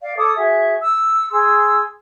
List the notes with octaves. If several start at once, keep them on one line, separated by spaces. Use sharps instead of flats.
D5 F5
A4 C#5 D6 D#6
F#4 G#4 E5
E6
G#4 C6 E6